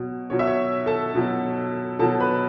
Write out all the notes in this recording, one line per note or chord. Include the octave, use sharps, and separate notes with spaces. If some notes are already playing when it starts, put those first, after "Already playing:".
Already playing: B2 F#3
B2 F#3 C#5
E5
C#5
A4 A5
B2 F#3
B2 F#3 A4 A5
B4 B5